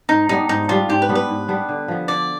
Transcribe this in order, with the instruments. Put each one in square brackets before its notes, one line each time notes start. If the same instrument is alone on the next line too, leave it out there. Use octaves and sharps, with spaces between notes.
[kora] G#2 [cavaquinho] D#4
[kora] G3 B3 D4 [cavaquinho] D#4
[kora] G#2 [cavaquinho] D#4
[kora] G3 B3 D4 [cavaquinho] F4
[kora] G#2 [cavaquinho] G4
[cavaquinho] B4
[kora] G3 B3 D4
[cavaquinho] B4
[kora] G#2
G3 B3 D4
D3
F3 B3
[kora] D3 [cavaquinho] D5